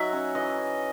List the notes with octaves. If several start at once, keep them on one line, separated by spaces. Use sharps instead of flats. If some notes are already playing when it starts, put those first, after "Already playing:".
Already playing: F#3 D#4 E5 F#5
C#4
E3 D#5
C#4